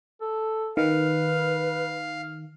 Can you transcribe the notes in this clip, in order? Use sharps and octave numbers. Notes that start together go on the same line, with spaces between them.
A4
D#3 B4 F5